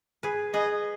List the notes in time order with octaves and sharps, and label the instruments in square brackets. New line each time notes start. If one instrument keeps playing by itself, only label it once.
[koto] G#4 B4
[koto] G#4 B4 [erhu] D#5